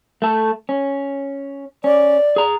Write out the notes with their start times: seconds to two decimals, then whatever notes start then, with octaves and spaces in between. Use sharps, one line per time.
0.22 A3 A4
0.69 C#4
1.84 C#4 D5
2.36 G#4 A#5